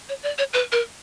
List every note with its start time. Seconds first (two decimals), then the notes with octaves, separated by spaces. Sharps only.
0.09 C#5
0.23 D5
0.38 C#5
0.53 B4
0.72 A#4